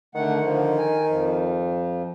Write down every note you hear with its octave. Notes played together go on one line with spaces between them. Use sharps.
D3 D#3 A3 F#5
D3 F3
G#5
F2 F3